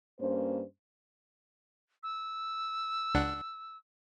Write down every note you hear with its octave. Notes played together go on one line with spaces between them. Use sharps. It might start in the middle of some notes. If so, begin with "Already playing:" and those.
G2 A#3 C#4 C5
E6
C#2 D4 F#5